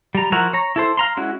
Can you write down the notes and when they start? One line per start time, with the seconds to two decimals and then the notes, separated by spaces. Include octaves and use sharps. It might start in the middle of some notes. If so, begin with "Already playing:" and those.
0.15 G3 A#5
0.32 F3 E4 F#4 A#4 A#5
0.53 C#5 A#5
0.76 E4 A4 C5
0.97 F5 A#5 C6
1.17 G#3 C#4 E4 F#4